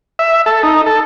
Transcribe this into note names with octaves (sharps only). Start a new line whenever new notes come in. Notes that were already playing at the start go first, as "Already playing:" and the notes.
E5
A4
D#4
A4